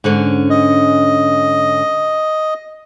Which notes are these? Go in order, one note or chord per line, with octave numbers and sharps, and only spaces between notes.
G#2 D3 C#4
D#5